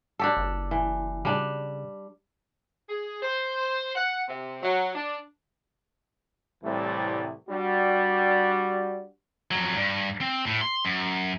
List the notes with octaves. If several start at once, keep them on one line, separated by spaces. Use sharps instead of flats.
D4 G4 A4
F#1
E3
C#3 G3 D4
G#4
C5
F#5
C3
F#3
D4
C2 A2 C3 E3 G3 A3
G3 D4 F#4
F2 F#3
G2
C4
A2
C6
F#2